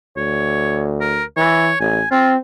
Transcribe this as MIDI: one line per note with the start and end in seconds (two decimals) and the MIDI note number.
0.17 1.22 38
0.17 0.87 73
1.01 1.24 70
1.37 1.72 52
1.37 1.76 73
1.80 2.01 33
1.80 2.09 80
2.11 2.36 60
2.11 2.31 65